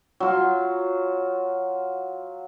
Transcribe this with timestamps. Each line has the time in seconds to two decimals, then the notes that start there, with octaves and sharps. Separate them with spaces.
0.20 F#3 F4